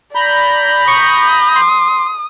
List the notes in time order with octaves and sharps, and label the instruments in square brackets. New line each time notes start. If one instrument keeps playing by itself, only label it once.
[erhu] D5 [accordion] A#5 B5 G6
[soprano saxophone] C#6 [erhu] D#6
[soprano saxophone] C6